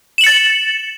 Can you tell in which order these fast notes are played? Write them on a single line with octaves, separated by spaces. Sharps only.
E7 F#7 C#7 A6